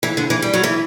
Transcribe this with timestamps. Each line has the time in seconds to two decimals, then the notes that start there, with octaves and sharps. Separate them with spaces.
0.03 E3
0.17 D3
0.30 E3
0.42 G3
0.54 F#3
0.63 E3